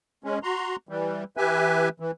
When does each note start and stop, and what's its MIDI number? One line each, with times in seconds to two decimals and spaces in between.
0.24 0.39 56
0.24 0.39 61
0.43 0.76 66
0.43 0.76 82
0.43 0.76 84
0.89 1.24 52
0.89 1.24 55
1.37 1.89 52
1.37 1.89 67
1.37 1.89 71
1.37 1.89 76
1.37 1.89 80
2.00 2.11 52